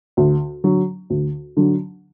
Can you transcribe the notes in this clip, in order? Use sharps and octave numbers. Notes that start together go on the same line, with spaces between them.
D2
D3 F#3
D2
D3 F#3